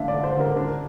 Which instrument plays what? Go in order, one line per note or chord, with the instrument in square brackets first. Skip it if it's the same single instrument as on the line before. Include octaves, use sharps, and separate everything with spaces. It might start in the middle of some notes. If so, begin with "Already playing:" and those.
Already playing: [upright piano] D3 A3 D4 E5 F5
D5
D3
C5
D3 A#4
D4 A#4